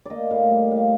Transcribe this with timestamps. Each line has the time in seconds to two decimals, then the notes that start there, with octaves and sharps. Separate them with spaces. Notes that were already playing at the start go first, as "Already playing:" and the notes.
0.06 A#3 D5 D#5
0.30 A2 F5
0.51 G3 D#5
0.71 A2 F5